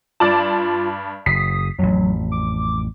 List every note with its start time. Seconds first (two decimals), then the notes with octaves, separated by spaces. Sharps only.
0.20 G2 F4 D5 A5
1.26 F#1 D#6 B6 C7
1.78 A1 F2 F#3
2.32 D6